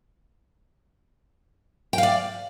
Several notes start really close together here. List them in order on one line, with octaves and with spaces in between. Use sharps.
G5 F5 D5